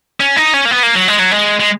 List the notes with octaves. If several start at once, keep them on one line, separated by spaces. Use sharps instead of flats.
C#4
D#4
C#4
A#3
B3
A#3
F#3
G#3
F#3
G#3
G#3